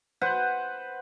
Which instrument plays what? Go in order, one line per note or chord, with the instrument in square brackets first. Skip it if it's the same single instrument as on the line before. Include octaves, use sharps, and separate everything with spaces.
[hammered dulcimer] B4 C5 F#5